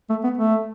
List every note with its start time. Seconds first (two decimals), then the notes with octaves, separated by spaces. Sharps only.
0.09 A3
0.24 B3
0.37 A3